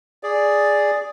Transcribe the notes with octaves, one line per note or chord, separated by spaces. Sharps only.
G#4 D5